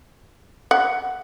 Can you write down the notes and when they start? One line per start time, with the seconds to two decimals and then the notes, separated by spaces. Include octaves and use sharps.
0.71 F#5